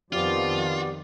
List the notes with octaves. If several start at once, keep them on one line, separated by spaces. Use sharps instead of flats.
F2 D#3 F3 B3 F4 G4 D5